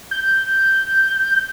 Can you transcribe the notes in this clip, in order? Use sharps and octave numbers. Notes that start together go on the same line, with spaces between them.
G6